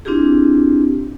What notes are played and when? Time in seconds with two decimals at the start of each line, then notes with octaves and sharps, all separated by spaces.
0.05 C4 D4 E4 F4 G4 G#4